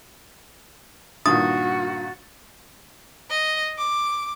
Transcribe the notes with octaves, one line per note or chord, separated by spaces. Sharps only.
G2 A#2 D#3 F#4 D#6 A6
D#5
D6